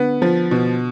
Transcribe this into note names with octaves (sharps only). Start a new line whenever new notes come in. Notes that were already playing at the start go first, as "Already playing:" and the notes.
Already playing: D3 B3
F3
B2